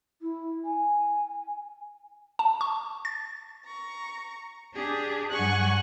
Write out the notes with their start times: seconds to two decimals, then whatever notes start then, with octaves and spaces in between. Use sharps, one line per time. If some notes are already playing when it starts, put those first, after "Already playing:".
0.21 E4
0.64 G#5
2.39 A5
2.61 C#6
3.05 A6
3.65 A#5 C#6
4.72 D4 G4 G#4
5.31 G2 F#3 F#5 G#5 C#6 F#6